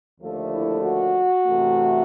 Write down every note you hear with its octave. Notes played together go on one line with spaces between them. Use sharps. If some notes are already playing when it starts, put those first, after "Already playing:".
D#2 D3 F3 A3
E4
F#4
E2 C3 E3 A3